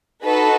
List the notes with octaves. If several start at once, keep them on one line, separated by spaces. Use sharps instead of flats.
D#4 F#4 A4 B4